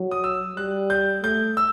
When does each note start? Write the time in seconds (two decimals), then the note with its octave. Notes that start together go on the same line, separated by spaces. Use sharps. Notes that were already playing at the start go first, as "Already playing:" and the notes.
Already playing: F#3
0.11 D#6
0.24 E6
0.56 G3 F#6
0.90 G6
1.23 A3 G6
1.57 E6